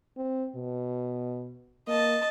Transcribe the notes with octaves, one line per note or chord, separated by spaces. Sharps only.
C4
B2
A#3 D#5 A5